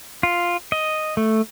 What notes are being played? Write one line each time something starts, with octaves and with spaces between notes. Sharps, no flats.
F4
D#5
A3